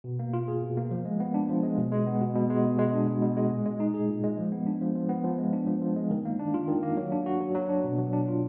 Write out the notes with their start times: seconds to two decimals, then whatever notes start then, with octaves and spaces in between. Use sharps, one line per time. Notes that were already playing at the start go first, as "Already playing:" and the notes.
0.04 B2
0.19 A#3
0.33 F4
0.48 G#4
0.62 B2
0.77 A#3
0.91 F3
1.05 G#3
1.20 B3
1.34 D4
1.49 F3
1.63 G#3
1.77 B2
1.92 G#3
2.07 B3
2.21 B2
2.35 B2
2.50 G#3
2.65 B2
2.79 G#3
2.93 D4
3.07 B2
3.22 B2
3.37 G#3
3.50 A#2
3.66 G#3
3.80 D#4
3.94 G#4
4.09 A#2
4.23 G#3
4.38 F3
4.52 B3
4.67 D4
4.81 F3
4.95 F3
5.09 B3
5.24 F3
5.38 G#3
5.53 D4
5.67 F3
5.82 F3
5.96 G#3
6.11 D#3
6.25 A#3
6.39 D4
6.54 F4
6.68 D#3
6.83 A#3
6.97 F#3
7.12 D4
7.26 F#4
7.40 F#3
7.55 F#3
7.69 D4
7.84 B2
7.98 F#3
8.13 D4
8.28 F4